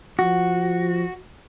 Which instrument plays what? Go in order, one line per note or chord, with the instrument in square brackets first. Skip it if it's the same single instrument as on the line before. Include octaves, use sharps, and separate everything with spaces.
[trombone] F3 [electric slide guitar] F#4